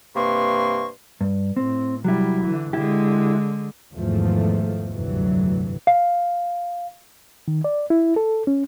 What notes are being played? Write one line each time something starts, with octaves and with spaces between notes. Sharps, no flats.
G2 C3 A#3 B4 C6 C#6
G2
A2 C4
C3 F#3 G3 E4
D3 E3
D3 G#3 E4 G4
E2 G#2 D#3 F3 A3
F1 D2 G2 E3 F#3
F5
D#3
D5
E4
A4
C#4